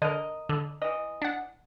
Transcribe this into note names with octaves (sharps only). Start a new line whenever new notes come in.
D3 A#4 D#5
D3
E3 D#5
D4 F#5